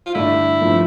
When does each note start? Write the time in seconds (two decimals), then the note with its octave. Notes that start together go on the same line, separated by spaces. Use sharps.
0.06 F4
0.15 G2 D3 A3 D4 E4
0.62 G2 F3 A3